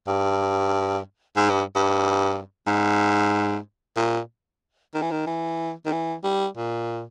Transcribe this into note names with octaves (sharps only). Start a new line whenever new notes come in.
G2
G#2
G2
G2
G#2
A#2
D#3
E3
D#3
E3
D#3
E3
G3
A#2